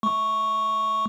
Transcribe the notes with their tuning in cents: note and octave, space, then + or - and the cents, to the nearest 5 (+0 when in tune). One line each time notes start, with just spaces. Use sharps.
A3 -30 C#6 +0